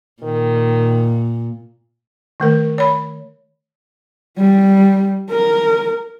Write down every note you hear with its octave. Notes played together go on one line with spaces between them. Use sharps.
A#2 D#3
D#3 A3 A#4
C#5 B5
G3
A#4